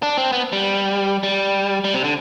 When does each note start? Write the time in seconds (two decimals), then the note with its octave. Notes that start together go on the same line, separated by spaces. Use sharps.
0.03 D4
0.17 C4
0.33 B3
0.53 G3
1.23 G3
1.84 G3
1.94 C3
2.04 D3